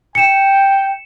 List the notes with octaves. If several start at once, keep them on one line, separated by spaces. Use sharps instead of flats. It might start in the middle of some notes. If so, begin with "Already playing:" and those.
G5 C#7 E7